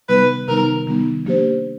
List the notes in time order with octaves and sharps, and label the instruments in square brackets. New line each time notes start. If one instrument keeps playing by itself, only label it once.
[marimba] C3 D#3 G3 B3 D#4 [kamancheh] B4
[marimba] C3 D#3 G3 B3 D#4 [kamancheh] A#4
[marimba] C3 D#3 G3 B3 D#4
F3 A#3 D4 G4 C5